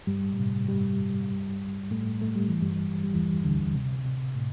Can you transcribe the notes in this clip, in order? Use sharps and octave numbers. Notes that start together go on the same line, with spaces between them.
G2 G3
A2
C3
G2 G3
A2 A3
A3
G3
E3
G2 G3
G3
E2 E3
D2 D3
C3
C3
A2